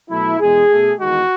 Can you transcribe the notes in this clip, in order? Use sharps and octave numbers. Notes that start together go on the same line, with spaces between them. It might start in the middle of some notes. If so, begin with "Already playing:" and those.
B2 F#3 A3 E4
E2 B2 G#3 G#4
B2 A3
E2 D#3 G#3 F#4